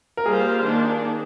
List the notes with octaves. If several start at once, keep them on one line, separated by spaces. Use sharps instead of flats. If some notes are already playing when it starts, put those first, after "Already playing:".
A#4
G3 A#3 F4 G#4 C5
D#3 A#3 D4